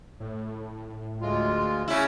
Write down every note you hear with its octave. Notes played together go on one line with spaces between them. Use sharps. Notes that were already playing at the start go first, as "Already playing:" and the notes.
A2
D2 G#3 F4
C#3 E4